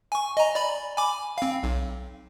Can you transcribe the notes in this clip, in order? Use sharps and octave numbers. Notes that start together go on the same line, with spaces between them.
G#5 C#6
D#5 G#5 A#5
D5 B5
G#5 B5 D6
C4 F5
B1